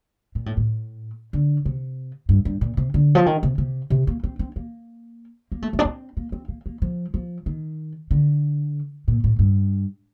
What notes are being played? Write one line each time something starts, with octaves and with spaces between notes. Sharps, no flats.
A#2
A2
A2
D3
C3
G2
G2
A#2
C3
D3
F3
D#3
C3
C3
C3
A#3
C4
C4
A#3
A#3
A3
A3
D4
C4
A#3
C4
A#3
A#3
F3
F3
D#3
D3
A#2
A2
G2